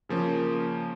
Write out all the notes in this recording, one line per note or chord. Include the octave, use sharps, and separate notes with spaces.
C#3 F3 A#3 C#4